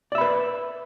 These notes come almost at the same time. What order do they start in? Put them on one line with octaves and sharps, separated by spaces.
D5 E5 B5 B4